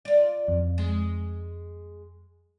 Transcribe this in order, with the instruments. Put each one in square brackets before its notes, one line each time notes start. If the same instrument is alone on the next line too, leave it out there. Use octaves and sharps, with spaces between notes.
[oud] F4 D5
[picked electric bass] F2
[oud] G#3